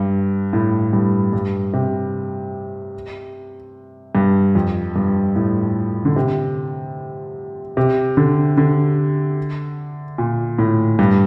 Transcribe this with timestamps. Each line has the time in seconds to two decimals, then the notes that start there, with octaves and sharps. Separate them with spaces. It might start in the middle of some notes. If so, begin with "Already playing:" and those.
Already playing: G2
0.53 A2
0.93 G2
1.33 G2
1.73 C3
4.15 G2
4.55 F2
4.96 G2
5.36 A2
6.05 D3
6.16 C3
7.77 C3
8.17 D3
8.57 D3
10.18 A#2
10.58 A2
10.99 G2